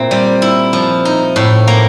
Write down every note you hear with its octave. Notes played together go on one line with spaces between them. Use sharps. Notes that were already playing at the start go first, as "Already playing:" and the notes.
Already playing: A#2 C4 E4
G3
E4
F3
D#4
A2
A#3